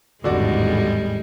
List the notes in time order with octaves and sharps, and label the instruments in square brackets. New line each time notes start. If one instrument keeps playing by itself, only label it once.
[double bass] G#1 E2 [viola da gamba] A2 G3 G#3 [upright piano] D3 F#4 D5